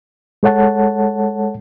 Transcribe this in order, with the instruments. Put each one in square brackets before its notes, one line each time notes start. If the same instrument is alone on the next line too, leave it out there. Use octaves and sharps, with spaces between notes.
[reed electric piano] G#3 A4 C#5 F#5 A5